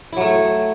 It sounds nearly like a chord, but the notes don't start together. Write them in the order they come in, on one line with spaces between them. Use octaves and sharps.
E4 F#3 A3